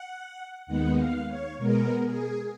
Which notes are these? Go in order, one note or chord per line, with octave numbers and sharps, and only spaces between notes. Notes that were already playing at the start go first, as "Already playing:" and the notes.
Already playing: F#5
D#2 D#3 G#3 B3 F#5
F5
C#5
B2 G#3 B3 A#4
G#4